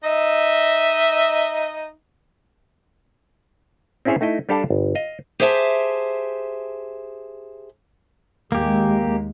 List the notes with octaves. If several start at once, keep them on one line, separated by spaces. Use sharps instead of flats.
D#4 D#5 E5
C4 C#4 E4 G#4 C5 C#5
A3 D#4 E4 D#5
G3 D4 G4 A4 F5 A5
G1
D#5 F5
G4 G#4 C5 E5 F#5 A5
D#2 G#3 A#3 G4